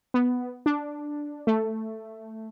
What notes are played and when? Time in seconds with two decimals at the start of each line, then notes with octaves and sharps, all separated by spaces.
0.14 B3
0.66 D4
1.47 A3